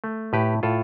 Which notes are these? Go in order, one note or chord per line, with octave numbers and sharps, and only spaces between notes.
A3
A2 G4 B4
A2 F4 A4